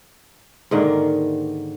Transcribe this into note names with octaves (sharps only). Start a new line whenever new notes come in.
G#2 D3 D#3 A#3